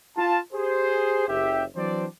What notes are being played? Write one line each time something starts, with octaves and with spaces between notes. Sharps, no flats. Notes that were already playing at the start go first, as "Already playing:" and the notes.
F4 A5
G4 G#4 C5
F#1 G4 E5
E3 F#3 C4 D4 C5 D5